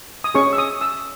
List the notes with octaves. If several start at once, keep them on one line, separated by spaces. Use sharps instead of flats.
D#6
C#4 G#4 C#5 C#6
E6
D#6
E6